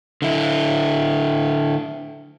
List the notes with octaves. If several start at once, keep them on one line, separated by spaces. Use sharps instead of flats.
D3 E4